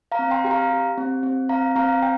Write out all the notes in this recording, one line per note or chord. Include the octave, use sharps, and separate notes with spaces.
F5 A#5
C4
G5 C6
G4 G5
F5 A#5
G4
C4
C4
C4 F5 A#5
C4 F5 A#5
G5